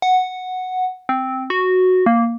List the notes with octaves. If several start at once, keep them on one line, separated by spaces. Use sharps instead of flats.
F#5
C4
F#4
A#3